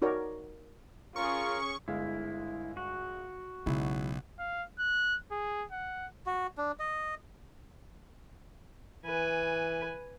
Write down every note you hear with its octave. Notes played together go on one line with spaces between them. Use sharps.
D#4 F#4 A#4 C#5 D5
C#4 F4 G#4 A#4 C#6
G1 G#3 E4 F5
F#4
B1 C#3 F#3 G#3 E4
F5
F#6
G#4
F#5
F#4
D4
D#5
E3 B4 G#5